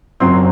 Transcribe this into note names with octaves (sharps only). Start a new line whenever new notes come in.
F#1 F#2 F#3 C4 C6